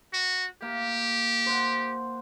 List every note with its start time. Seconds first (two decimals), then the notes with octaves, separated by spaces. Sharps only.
0.13 F#4
0.62 A#3 G4
1.46 C5 F#5